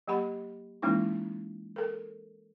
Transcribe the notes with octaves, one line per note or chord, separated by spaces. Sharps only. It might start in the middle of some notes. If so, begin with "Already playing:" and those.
F#3 A#3 G4 F#5 B5
E3 G#3 A#3 C#4 D#4 E4
A4 A#4